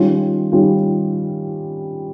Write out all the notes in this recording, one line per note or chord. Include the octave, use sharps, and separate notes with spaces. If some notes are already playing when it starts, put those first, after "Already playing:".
Already playing: D#3 G3 C#4 F4
D#3 G3 C#4 F4